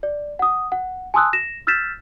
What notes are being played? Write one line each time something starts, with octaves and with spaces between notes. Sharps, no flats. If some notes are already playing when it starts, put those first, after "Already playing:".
D5
F#5 D#6
F#5
G#5 A5 C6 D#6 E6 F#6
A#6 E7
E6 F6 G6 A6 B6 E7